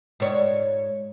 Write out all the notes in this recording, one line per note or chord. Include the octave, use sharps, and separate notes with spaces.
G#2 C#5